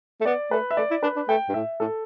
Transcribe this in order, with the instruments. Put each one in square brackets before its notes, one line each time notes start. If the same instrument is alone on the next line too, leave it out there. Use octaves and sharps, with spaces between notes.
[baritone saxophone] A3
[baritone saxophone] B3 [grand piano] D5
[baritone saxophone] A3 [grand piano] B4
[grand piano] E5
[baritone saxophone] A3 [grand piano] D5
[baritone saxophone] E4
[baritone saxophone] D4 [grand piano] B4
[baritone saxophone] D4
[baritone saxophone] A3 [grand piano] G5
[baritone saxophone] G2
[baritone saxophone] A2 [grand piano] E5
[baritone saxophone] A2 [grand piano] A4